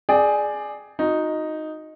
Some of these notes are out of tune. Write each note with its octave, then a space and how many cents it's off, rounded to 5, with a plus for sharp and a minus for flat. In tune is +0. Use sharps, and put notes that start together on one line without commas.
G#4 +10 D5 +15 G5 +0
D#4 +0 F#4 -35